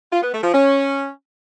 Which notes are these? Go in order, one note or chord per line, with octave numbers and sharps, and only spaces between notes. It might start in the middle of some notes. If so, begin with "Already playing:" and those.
F4
B3
A3
F3
C#4